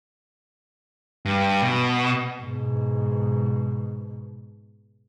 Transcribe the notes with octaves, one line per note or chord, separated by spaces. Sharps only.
G2
B2
G#2 B2